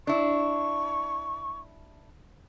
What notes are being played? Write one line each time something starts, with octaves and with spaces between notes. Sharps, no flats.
D4 E4 C#6